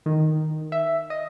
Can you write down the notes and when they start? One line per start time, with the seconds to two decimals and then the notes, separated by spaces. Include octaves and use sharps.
0.06 D#3
0.72 E5
1.10 D#5